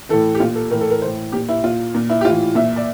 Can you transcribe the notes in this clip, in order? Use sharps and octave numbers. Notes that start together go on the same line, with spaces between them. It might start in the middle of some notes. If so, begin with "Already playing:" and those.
A2 E3 A4
G4
A#2 F4
A4
A2 E3 A#4
A4
A#4
A2 E3 C5
A#2 G4
E4
A#2 F4
A#2
E4
G4
A2 E3 F4
A#2 E5
D5